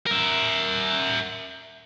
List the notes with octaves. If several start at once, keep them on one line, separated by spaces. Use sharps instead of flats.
A#4 E5